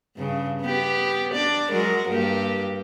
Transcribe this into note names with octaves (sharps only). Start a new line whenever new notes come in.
G2 C#3
B3 G4
D4 D5
F#3 G#3 A#4
G2 A#3 G4